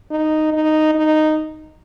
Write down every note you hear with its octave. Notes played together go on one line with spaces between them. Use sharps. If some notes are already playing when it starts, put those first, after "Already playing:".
D#4
D#4
D#4